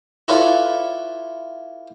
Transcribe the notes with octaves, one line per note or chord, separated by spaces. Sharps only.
E4 F4 A4 B4 C#5 D5